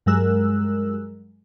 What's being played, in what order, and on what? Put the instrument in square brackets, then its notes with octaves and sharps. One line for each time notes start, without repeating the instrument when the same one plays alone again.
[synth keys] G2 F#3 G#3 A#4 E6 F#6